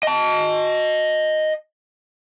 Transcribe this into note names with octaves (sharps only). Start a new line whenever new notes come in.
D#5 A5